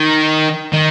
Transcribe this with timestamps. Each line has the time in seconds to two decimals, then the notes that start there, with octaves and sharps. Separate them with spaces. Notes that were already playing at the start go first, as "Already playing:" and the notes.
Already playing: D#3
0.73 D#3